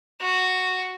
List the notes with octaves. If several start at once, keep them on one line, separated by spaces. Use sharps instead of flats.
F#4